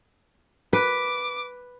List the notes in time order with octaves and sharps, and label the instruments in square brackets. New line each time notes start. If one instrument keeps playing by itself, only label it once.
[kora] B4 [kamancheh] D6